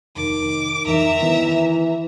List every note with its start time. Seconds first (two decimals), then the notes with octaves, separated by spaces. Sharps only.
0.16 F1 D#3 D6
0.86 F2 D#3 E3 E5 A#5
1.21 D#3 E3 B3